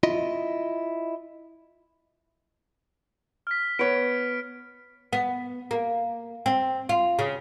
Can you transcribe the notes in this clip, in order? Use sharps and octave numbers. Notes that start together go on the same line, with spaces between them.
E4 F4 D#5
F6 B6
B3 C#5 D7
B3
A#3
C4
F4
C#3